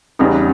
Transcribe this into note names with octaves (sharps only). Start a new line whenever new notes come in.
E2 C#3 G3 B3 D#4